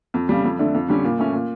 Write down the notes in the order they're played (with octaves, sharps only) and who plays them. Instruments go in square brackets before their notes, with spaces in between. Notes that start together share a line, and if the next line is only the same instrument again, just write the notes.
[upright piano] F2
C#3 G3
F2
D3 A3 D4
F2
D3 G3 C#4
A#2
A3 C#4
A#2